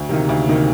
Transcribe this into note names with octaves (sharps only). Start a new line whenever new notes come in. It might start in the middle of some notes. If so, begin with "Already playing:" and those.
Already playing: D2
C3 D#3 A#3 D#4
D2
C3 D#3 A#3 D#4